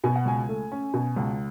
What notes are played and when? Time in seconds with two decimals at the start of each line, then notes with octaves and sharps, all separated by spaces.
0.04 B2 G#5
0.16 F#5
0.25 C#2 G#5
0.49 A3
0.72 C#4
0.94 B2
1.16 C#2